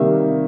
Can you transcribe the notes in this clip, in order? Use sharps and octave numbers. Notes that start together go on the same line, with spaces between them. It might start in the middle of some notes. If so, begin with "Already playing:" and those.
Already playing: C3 D#3 G3 A#3 E5